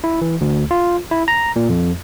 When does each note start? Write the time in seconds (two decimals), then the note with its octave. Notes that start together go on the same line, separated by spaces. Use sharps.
0.04 E4
0.21 E3
0.41 D2
0.71 F4
1.11 E4
1.28 A#5
1.56 A#2
1.70 F2